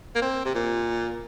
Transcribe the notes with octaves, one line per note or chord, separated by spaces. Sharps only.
A#3
C4
C3
A#2